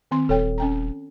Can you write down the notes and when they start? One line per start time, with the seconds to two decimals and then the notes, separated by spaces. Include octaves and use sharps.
0.11 D#3 C4 C6
0.29 D#1 A4 C#5 G5
0.58 C#4 G5 A#5